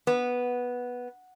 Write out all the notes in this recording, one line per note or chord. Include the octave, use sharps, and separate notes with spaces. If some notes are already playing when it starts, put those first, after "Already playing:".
B3